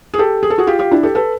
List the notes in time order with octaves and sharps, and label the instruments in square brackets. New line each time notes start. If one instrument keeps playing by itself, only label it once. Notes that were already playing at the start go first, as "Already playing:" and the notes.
[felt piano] G#4
G4 A4
G#4
A4
F#4 G#4
F4 G4
F4 G4
D4 E4
G4 A4
A4 B4